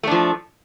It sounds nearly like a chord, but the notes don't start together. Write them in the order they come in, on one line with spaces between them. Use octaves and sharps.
A3 D4 F3